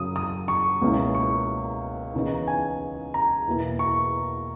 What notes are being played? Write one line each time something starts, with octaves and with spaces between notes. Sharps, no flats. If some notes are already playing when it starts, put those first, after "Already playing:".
Already playing: F#2 C#3 F#3 D#6
D#6
C#6
C#2 B2 A#3 C#4 E4
C#6
D#2 C#3 E3 B3 D#4
G#5
A#5
E2 B2 A#3 E4
C#6